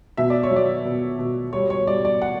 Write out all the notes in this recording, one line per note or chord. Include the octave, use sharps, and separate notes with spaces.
B2 E5
D5
C#5
F#3
D5
B2
B2
G3 C#5
C#5
G3 D5
D5
F#5